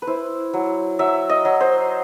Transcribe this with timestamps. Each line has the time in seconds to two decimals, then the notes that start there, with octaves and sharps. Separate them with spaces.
0.02 B4
0.07 E4 C5
0.54 F#3
0.99 F#3 E5
1.29 D#5
1.45 F#3
1.61 C5